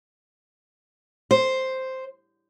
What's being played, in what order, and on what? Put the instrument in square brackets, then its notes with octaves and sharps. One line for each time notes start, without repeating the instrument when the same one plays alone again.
[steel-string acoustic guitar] C5